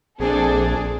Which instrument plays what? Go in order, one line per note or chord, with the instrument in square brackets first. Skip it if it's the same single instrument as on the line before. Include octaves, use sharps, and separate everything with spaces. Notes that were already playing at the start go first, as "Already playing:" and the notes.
[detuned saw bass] A#1 [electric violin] C4 [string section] D4 A4 [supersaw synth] G#4